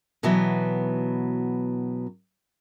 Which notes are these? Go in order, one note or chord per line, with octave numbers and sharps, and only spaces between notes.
B2 E3 F#3 B3